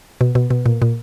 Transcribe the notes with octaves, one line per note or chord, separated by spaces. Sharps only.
B2
B2
B2
A#2
A#2